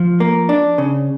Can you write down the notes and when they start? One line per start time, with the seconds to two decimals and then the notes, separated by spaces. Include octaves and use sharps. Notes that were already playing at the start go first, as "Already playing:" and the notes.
Already playing: F3
0.20 A#3
0.49 D4
0.78 C#3